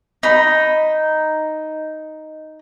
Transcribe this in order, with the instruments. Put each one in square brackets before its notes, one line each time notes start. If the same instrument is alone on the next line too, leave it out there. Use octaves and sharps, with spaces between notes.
[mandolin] D#4 B5